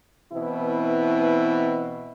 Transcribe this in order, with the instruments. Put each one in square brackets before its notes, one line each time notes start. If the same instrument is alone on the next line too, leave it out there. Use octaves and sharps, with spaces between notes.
[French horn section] B2 E3 C4 E4